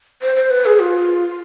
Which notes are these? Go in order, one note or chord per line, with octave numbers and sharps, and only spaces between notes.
C5
C5
B4
G#4
F4